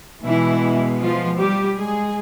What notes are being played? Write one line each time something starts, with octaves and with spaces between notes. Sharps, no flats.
B2 E3 G#3 B3 E4
F3 F4
G3 G4
G#3 G#4